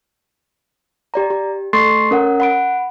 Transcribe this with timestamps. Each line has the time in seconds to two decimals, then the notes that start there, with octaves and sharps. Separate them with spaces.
1.14 G4 D5 A#5
1.30 G4
1.73 A3 A4 C6 C#6 A6 C7
2.11 C#4 A#4 F#5
2.40 F#5 B5 D7